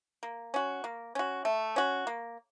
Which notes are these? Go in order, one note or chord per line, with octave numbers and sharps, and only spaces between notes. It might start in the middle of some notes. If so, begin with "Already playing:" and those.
A#3
C#4 F#4
A#3
C#4 F#4
A3
C#4 F#4
A#3